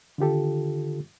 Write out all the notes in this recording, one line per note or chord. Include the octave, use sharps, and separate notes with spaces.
D3 D#3 F4 G4 A4